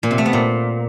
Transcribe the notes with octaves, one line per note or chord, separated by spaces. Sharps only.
A#2
C3
A3
B3
A#2